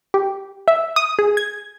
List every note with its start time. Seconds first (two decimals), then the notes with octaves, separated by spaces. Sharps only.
0.14 G4
0.68 E5
0.96 D#6
1.19 G#4
1.37 G#6